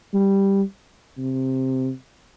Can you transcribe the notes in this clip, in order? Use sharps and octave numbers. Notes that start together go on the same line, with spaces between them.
G3
C3